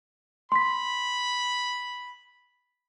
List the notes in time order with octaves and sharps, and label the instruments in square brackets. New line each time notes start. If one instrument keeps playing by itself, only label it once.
[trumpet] B5 [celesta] C6 B6